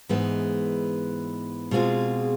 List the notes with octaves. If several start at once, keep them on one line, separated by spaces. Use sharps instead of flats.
G#2 E3 G#3 B3
B2 G#3 C4 F4 G#4